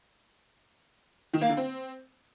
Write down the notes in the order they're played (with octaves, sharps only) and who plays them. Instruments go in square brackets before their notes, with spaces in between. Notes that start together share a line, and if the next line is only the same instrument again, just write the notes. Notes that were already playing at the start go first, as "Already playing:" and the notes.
[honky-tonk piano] D#3
A#3
D3
C4